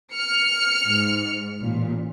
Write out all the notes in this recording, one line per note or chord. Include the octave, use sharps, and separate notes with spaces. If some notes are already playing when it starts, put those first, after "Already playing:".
F6 C#7
G#2
A1 A#2